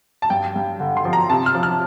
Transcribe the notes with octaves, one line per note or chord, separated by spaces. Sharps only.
A5
G2 G5
G2
D3
C6
F3
A#5
C3 A5
F6
F3
F6